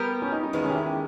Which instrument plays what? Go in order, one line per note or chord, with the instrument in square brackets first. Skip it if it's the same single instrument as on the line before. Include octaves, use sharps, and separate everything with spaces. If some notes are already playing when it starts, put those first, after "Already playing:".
Already playing: [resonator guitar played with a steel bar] G3 B3 G4 A#4
[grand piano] C#4
D#4
D#4
[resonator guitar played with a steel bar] E2 D#3 G#3 [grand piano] B3
[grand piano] C#4
G4
E4
G4